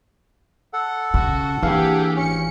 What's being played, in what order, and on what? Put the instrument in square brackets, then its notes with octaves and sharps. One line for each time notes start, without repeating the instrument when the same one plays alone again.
[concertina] A4 F#5
[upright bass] C#3 [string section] F#4
[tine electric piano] E3 F5 [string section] A#3 G4 G#4 [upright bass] D4
[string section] G#1 C#7 [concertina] C#4